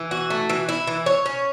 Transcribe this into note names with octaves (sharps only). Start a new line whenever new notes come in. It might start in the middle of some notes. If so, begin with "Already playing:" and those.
Already playing: E3
F#4
A3
E3
E4
E3
C#5
C#4